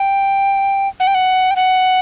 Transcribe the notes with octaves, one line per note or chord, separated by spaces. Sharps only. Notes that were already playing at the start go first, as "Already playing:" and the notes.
Already playing: G5
F#5
G5
F#5
G5
F#5